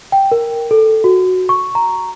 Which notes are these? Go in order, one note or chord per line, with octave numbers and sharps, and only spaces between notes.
G5
A#4
A4
F#4
C#6
A#5